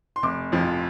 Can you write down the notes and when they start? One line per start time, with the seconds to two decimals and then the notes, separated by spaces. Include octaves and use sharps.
0.16 C6
0.23 F1 D6
0.52 F2 F3